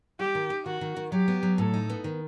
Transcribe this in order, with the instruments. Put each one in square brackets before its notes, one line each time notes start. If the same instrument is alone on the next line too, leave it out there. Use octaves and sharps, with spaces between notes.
[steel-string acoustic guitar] G3 [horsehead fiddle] G4
[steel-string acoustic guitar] D#3
D#4
[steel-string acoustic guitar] D#3 [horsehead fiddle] F#4
[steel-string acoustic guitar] D#3
D#3
[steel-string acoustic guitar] F#3 [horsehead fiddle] G4
[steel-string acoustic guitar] B3
F#3
[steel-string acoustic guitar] A2 [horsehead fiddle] A4
[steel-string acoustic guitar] D#4
B3
D#3